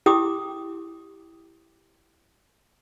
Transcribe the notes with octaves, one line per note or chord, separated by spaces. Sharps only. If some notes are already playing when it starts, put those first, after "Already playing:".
E4 G4 G5 D6 D#6